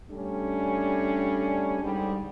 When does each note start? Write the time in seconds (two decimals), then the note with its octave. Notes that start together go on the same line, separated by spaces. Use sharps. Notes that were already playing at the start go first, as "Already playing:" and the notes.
0.10 G3 A3 C#4 D4
1.82 G#2 D3 G3